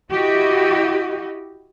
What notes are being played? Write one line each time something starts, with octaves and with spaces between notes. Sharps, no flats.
E4 F#4 G4 D#5